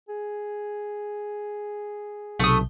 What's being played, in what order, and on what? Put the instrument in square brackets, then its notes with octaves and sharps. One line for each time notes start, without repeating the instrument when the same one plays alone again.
[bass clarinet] G#4
[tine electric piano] B1 C3 [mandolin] A3 D#6